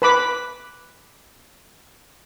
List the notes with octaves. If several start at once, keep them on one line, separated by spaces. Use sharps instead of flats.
B4 B5 D6